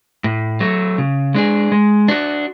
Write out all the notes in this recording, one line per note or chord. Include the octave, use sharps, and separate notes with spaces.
A2
F#3 A3
C#3
G#3 D4 G#4
G#3
D4 F#4